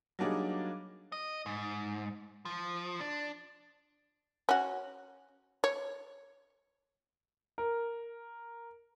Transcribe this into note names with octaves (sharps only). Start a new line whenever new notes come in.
F#3 G3 A#3 D4 D#4 G#4
D#5
G#2
F3
D4
C#4 F#4
C#5
A#4